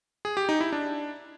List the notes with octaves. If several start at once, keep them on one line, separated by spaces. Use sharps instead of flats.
G#4
G4
D#4
E4
D4